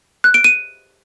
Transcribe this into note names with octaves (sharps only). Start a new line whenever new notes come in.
F#6
D7
D#7